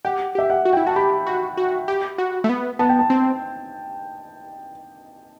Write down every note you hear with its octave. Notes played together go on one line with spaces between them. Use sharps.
G4 F#5
G4 E5
F#5
F#4
E4 G5
F#4 A5
G4 B5
F#4
F#4
G4
F#4
A3
B3
B3 A5
G5
A5
C4